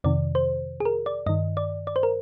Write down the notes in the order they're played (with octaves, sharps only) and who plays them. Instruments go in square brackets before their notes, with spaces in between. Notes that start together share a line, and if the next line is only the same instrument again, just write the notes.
[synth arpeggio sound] F2 C3 D#3 D5
C5
G#4
A#4
D5
G2 D#3 D#5
D5
D5
C5
A#4